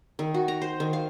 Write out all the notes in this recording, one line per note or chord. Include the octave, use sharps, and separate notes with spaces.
D#3
F#4
A#5
C5
D#3
F5